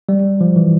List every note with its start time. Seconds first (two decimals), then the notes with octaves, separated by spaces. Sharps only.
0.09 G3
0.41 F3
0.56 E3